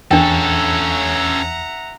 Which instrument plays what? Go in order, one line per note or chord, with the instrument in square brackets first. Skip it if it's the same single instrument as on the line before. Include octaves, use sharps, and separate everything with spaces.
[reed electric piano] E2 [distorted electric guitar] C#4 A4 [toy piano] D4 G5 [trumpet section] E5 F#5 A#5